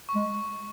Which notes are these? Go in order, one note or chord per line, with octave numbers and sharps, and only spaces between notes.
C#6
G#3